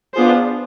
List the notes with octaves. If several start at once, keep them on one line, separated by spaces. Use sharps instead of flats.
B3 D4 F4 G#4 C5